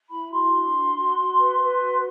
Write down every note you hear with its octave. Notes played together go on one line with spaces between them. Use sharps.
E4 B5
F#4 C6
D4
F#4
F#4
F#4
B4
B4
F#4